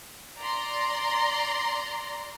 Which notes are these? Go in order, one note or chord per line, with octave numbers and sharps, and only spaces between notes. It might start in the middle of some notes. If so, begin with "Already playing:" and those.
D5 A#5 C6